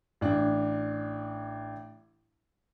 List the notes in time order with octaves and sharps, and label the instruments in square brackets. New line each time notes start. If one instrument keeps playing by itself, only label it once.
[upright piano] A1 D4